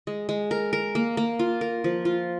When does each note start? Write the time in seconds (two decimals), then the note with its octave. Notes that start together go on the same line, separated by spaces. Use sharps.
0.07 G#3
0.29 G#3
0.51 A#4
0.73 A#4
0.95 A#3
1.17 A#3
1.39 F4
1.61 A#4
1.84 F3
2.05 F4